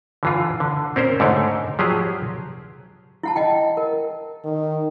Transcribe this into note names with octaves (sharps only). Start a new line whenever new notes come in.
D3 E3 F4
D3
C4 C#4 A#4 C5
G#2 D3 A3 C#5 G5
F3 F#3 G4 G#4
E4 F#5 A5
D#5 F#5 G5
A#4
D#3